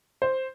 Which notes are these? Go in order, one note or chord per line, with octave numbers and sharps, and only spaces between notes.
C5